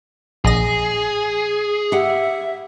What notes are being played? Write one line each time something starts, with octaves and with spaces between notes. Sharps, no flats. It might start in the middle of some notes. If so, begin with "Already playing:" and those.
A#1 G#4 D#5 A#6
G4 E5 F#5